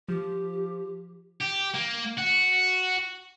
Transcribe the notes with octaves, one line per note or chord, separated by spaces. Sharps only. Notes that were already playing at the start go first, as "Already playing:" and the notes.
F3 G4
G4
A#3
F#4